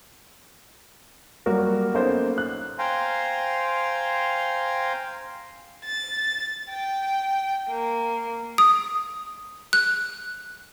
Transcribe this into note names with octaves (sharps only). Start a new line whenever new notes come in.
F#3 G3 A#3 F#4 A#4
A#3 B3 C#4 D#4 A4 C5
F#6
C5 F5 G5 G#5 A#5 C6
A6
G5
A#3
D#6
F#6